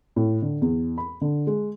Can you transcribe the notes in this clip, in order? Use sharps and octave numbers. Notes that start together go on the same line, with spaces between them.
A2
D3
E2
B5
D3
G#3